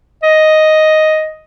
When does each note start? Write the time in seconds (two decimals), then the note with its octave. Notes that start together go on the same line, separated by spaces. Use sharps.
0.23 D#5